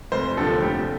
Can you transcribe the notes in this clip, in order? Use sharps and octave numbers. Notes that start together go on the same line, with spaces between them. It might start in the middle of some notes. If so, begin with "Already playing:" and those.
F1 C5
D#2 D3 F3 A4
F1 G4